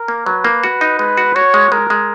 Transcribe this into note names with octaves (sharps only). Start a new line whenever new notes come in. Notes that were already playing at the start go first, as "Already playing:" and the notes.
Already playing: A#4
A#3
F#3 B4
A#3
F#4
D#4
G#3 B4
F#4
F#4 C#5
G#3
G#3 A#4
G#3